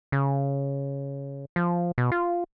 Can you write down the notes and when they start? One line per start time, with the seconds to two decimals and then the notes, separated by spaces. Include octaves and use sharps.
0.12 C#3
1.56 F3
1.98 B2
2.12 F4